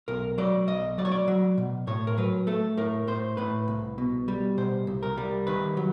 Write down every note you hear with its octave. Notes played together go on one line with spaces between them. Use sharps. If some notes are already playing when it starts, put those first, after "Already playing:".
B1 A#4
F#3 D5
B1 D#5
F#3 D5
C#5
D5
F#3
B2
A2 C#5
A#4
F#3 B4
A3 A4
A2 A#4
A2 C5
A2 B4
C2
B2
G3
B2 C5
C2
A#4
G3
D#3 B4
F#3